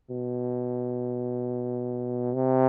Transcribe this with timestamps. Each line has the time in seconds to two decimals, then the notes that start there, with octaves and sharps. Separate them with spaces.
0.10 B2
2.35 C3